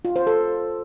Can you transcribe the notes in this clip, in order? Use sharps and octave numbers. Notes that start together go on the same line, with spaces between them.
F4
C5
A4